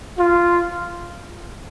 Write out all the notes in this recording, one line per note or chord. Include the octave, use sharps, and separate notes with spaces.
F4